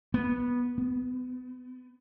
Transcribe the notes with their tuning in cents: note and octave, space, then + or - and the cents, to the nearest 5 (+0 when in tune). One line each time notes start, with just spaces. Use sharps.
B3 -15
B3 +35